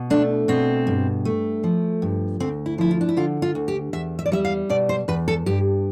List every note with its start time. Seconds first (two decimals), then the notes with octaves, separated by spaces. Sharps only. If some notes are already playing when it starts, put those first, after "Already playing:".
Already playing: B2
0.10 A3 D4
0.48 B2 C4
0.87 G2
1.25 A3
1.64 F3
2.02 G2
2.40 D2 C4
2.66 E4
2.78 F3 E4
2.91 F4
3.01 D4
3.09 E4
3.17 D3 F4
3.42 F4
3.55 D2
3.68 G4
3.93 E2 E5
4.19 E5
4.26 D5
4.32 G3 E5
4.45 F5
4.69 B2 D5
4.89 C5
5.08 E2 B4
5.28 A4
5.46 G2 G4